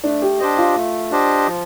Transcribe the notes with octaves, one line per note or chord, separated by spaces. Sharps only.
A3 D4
G4
D4 G4 C5 D#5
F4
A3
D4 G4 C5 D#5
F3